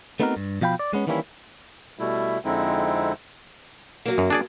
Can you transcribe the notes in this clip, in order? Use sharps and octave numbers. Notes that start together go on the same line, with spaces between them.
A3 B3 C4 D#4 F#4 A#4
G2
B2 F3 F5 G5 B5
D5
G#3 B3 C#4
D#3 E3 G3 A#3 C#4 E4
B2 G3 A3 E4
F2 D3 G#3 C4 D#4 E4
F#3 A#3
F#2
D4 G#4 D5